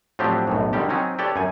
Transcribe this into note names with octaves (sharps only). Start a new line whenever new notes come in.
A2 F3 F#3 C4 D4 G4
B1 F#2 A2
D3 D#3 G3 G4
F#3 C4 C#4 D#4
G4 A4 B4 C#5 D5 G5
F#2 G#5